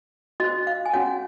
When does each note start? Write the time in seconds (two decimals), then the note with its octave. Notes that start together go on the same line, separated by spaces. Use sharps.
0.40 F#4 D#5
0.44 C5
0.67 F5
0.86 G#5
0.93 C#4 F#4 C#5 F#5